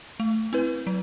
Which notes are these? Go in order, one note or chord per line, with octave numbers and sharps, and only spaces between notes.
A3
C4 E4 B4
F#3